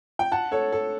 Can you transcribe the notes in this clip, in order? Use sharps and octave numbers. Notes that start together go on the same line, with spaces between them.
G5
F#5 A5
A4 C#5
A4